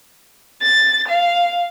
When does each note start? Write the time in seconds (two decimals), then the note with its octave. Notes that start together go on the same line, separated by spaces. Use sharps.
0.60 A6
1.07 F5